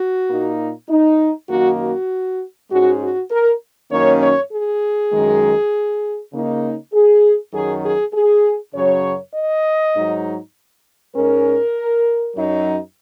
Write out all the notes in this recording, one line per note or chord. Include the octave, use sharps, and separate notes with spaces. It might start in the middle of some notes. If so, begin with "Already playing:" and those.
Already playing: F#4
A#2 A#3 D#4
D#4
F#2 D#3 A#3 D#4 F#4
F#4
G#2 G#3 C#4 F#4
F#4
A#4
F#2 D#3 A#3 C#4 C#5
C#5
G#4
F#2 D#3 G#3
C#3 A#3 D#4
G#4
F#2 D#3 F#3 G#4
G#4
G#4
F#2 C#3 F#3 C#5
D#5
G#2 F#3 D#4
G#2 G#3 C#4 A#4
F#2 F#3 D#4